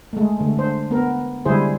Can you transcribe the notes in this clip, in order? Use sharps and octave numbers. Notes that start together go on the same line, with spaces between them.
G#3 A3
D3 A3
D4 C5
B3 A#4
D3 G3 G#3 E4 G#4 C5